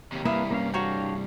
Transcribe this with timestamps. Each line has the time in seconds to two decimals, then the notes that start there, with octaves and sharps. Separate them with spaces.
0.12 D#2 C3
0.25 C2 G2 A#3 E4 B4 F5 D#6
0.51 A#3 C#4 F5
0.74 D4 F#4 C#5 F5 G5 A#5